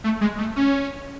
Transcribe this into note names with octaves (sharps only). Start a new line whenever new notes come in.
A3
G#3
A3
C#4